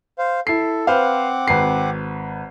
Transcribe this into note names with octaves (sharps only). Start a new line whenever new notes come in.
C5 F5
E4 A4 C7
C4 B4 C5 F5 F#5 D6
G#1 B4 C7